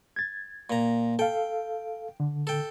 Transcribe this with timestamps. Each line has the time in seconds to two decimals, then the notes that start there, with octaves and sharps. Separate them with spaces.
0.16 G#6 A6
0.70 A#2 A#5
1.19 A4 F5 G5
2.20 D3
2.47 A4 G5